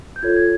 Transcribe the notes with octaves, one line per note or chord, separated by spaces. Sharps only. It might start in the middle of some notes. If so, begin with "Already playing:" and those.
G6
F4 A4 C#5 G#6
G#6